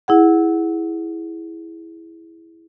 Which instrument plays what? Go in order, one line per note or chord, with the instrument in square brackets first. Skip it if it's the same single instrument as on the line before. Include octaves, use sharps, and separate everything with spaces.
[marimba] E4 G#4 F#5